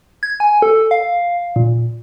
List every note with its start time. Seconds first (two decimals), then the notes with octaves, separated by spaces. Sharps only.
0.23 G#6
0.40 G#5
0.62 A4
0.91 F5
1.56 A#2